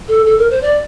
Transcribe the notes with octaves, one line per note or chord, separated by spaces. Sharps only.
A4
A4
A#4
C5
D5